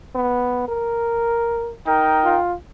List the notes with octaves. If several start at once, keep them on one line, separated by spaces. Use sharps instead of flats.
B3
A#4
D#4 A#4 G5
F4